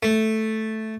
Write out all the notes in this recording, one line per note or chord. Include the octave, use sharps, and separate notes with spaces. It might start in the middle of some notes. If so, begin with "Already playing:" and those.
A3